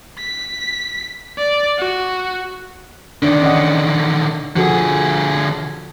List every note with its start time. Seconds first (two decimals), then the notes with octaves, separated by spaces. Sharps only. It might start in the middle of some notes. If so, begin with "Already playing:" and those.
0.19 B6
1.38 D5
1.78 F#4
3.23 D3 D#3 D4 D5
3.42 C#4 D#5 F#5
4.56 D3 F3 F#4 G#4 A4